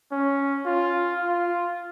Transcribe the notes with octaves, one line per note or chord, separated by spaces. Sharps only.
C#4
F4
F4